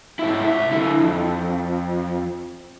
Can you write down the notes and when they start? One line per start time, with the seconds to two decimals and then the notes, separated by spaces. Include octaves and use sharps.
0.19 G#2 E4
0.44 C2 E5
0.71 D3 E4
1.00 F2